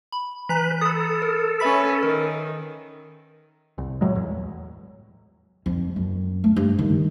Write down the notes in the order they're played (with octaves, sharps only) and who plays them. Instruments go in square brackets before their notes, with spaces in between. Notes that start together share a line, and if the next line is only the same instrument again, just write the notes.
[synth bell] B5
[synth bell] E3 A#5 B6 [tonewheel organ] B4
[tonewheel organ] A4 [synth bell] B5 D#6
[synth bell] A#4
[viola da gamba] C#4 B4 [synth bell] E5 B5 B6
[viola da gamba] D#3 [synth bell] A#4
[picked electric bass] C2
A2 F#3 G#3
A1 E2
[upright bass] F2
F#2
A3
G2
D#3